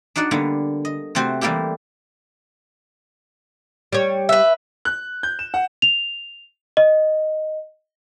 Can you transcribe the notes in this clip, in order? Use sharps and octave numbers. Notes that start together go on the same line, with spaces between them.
D4 D#4 F#4 D5 F#5
D3 G3 A#3 B3
D#5
C3 A3 C4 F#4 C5
E3 G3 A3 A#3 E4 G4
G3 C#5
B4 E5
F#6
G6
E7
F#5
F7
D#5